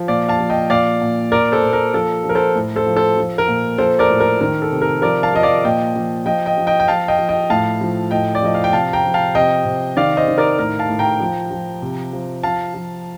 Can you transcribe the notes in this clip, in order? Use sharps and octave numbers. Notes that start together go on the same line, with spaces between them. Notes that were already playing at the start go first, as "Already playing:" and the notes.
Already playing: F3
A#2 D5 F5
F5 A5
F3
D#5 G5
A#2 D5 F5
A#2
A#2 A#4 D5
A4 C5
A#2
A#4
F3 A4
F3
A#4
A4 C5
A2
A4 C5
F3
A4 C5
F3
A#4
A#2
F3 A4 C5
A#4 D5
A2
A#4
D#3 A#4
A4
C3
A#4
F3 A#4 D5
F5 A5
F3 D#5
D5 F5
A#2 D#5 G5
F3
F3 D#5 G5
D#5 G5
F3
D#5 G5
G5
F3 F5 A5
D#5 G5
F3
D#5 G5
A2 F5 A5
F3
A2 D#5 G5
D5
F3 D#5
F5
G5
C3 F5 A5
G5 A#5
F3
F5 A5
C3 D#5 G5
C3
D#3 D5 F5
C5 D#5
D#3
A#4 D5
A2 A#4
F5 A5
A2
G5 A#5
F3
F3
C3
F3
F3 F5 A5
F3